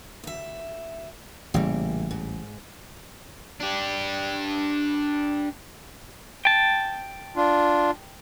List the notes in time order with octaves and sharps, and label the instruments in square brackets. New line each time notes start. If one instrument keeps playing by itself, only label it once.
[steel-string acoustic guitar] D2 E5
[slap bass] A1 C#3 G3 [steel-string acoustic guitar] A#2 E3
[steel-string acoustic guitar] G#2
[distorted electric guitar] D4 G4
[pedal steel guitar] G5 A5
[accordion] D4 F4